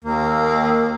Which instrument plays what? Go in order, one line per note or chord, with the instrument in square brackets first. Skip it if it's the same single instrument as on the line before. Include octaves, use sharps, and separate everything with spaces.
[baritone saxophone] D#2 [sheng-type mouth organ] A#3